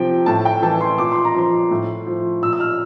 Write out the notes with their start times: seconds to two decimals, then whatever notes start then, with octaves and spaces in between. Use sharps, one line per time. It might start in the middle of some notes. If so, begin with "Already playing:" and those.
Already playing: C3 F3 G5
0.26 A2 A5
0.45 G5
0.62 E3 A5
0.81 C6
0.98 A#2 D6
1.12 C6
1.25 A#5
1.35 F3 C6
1.71 A2
2.07 F3
2.42 A#2 E6
2.53 E6
2.60 F6